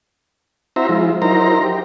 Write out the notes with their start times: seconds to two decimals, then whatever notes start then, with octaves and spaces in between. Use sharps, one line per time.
0.76 C4 E4 F#4 C5 E5 A#5
0.89 F3 G#3 E4 F4
1.22 F#3 D#4 E4 A#4 C5 A#5
1.63 G4